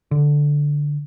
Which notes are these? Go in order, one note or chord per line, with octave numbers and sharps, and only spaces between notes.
D3